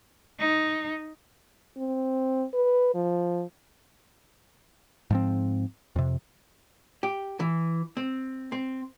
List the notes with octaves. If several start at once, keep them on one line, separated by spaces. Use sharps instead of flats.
D#4
C4
B4
F3
G#2 F3 C4
F2 C3
G4
E3
C4
C4